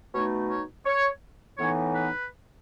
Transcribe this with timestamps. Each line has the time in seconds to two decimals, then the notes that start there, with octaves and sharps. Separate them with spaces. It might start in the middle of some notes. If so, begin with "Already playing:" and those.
0.13 B2 A3 D#4 C#5
0.50 C#5
0.86 C#5
1.57 A2 E3 B3 D#4 C#5
1.94 B4